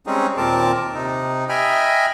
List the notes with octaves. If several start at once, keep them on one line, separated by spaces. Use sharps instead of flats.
G3 G#3 C4 C#4 D#4 G#4
D#2 A#2 C4 A#4 A5 D6
C3 D#4
D#5 E5 G5 G#5 B5 F6